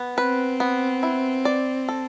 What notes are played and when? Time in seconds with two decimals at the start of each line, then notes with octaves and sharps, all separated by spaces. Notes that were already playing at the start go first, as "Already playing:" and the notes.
Already playing: B3
0.18 C4 B4
0.60 B3
1.03 E4
1.45 D5
1.88 A4